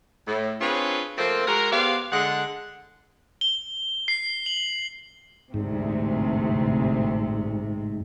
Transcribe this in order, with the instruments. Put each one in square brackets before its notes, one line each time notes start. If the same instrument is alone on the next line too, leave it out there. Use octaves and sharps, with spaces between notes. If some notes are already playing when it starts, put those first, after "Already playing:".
[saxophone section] A2
C4 D4 F4 G#4 B4 C#5
F3 A3 A#3 C4
G#3 F#4 G#4 A#4
B3 G4 C5 D5 F5
D3 G#3 F#5
[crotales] G7
C7
F#7
[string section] A1 D2 C3 [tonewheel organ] G#2